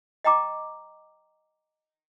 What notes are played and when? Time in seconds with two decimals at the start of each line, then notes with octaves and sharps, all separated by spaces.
0.24 D#5 G5 A#5 D6